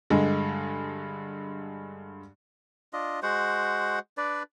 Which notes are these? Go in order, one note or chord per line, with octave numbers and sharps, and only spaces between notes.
G2 D3 G#3
D4 F4 D#5
G#3 F#4 C5 F#5
D4 B4 D5